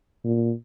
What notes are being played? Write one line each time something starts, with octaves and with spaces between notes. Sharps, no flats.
A#2